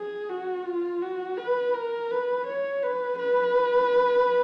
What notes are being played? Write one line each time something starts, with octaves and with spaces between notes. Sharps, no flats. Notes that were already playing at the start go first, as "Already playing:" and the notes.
Already playing: G#4
F#4
F4
F#4
B4
A#4
B4
C#5
B4
B4